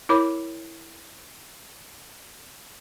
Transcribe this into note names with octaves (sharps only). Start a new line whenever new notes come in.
E4 A#4 C#5 B5 D6